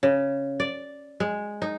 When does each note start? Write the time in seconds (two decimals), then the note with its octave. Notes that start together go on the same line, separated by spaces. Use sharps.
0.03 C#3
0.60 D5
1.20 G#3
1.62 D#4